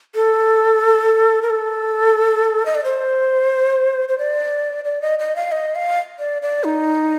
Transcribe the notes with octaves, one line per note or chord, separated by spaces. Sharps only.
A4
A#4
A4
D#5
D5
C5
C5
D5
D5
D#5
D#5
F5
D#5
F5
D5
D5
D#4